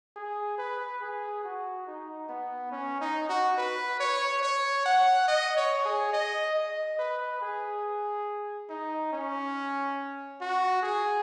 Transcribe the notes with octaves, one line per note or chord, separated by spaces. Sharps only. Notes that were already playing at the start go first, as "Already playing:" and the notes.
G#4
B4
G#4
F#4
D#4
B3
C#4
D#4
F#4
B4
C#5
C#5
F#5
D#5
C#5
G#4
D#5
D#5
B4
G#4
D#4
C#4
F#4
G#4